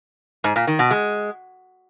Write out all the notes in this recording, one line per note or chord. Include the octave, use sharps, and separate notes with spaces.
G#2
A#2
D#3
B2
G#3